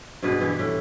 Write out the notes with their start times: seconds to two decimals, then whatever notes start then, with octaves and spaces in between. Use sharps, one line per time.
0.23 G2 B2 G#4 B4
0.41 G2 E3 E4 G4
0.59 A2